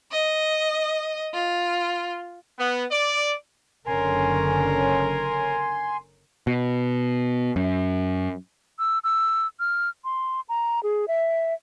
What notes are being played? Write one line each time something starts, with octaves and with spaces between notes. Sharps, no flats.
D#5
F4
B3
D5
F#1 D3 C#4 A#4 G#5 C6
B2
F#2
E6
E6
F6
C6
A#5
G#4
E5